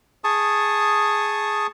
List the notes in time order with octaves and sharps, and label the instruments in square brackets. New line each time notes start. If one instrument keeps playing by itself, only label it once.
[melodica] G#4 A5 C#6 D#6